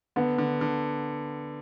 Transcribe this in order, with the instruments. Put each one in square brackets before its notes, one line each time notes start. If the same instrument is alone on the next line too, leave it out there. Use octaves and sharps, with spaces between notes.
[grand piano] D3 [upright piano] B3
[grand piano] D3
D3